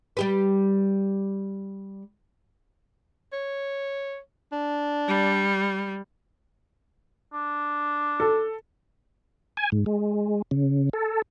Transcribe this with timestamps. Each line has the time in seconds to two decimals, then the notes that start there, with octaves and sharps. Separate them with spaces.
0.17 G3 G4 B4
3.33 C#5
4.52 D4
5.08 G3
7.33 D4
8.20 A4
9.57 G#5
9.72 G#2
9.86 G#3
10.51 C#3
10.93 A4